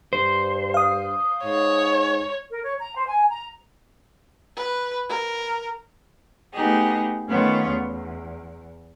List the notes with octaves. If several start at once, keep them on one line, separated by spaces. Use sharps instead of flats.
G2 C5
F5 D#6
G#2 C#5
A#4
C#5
A#5
C5
G#5
A#5
B4
A#4
A3 B3 D#4 G4 G#4
D#3 A3 B3 C#4 F4 C#5
E2